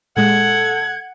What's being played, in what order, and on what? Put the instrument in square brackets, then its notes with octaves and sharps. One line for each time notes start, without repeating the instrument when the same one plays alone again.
[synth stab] A#2 G#3 [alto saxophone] A4 [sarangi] F#5 [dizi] G#6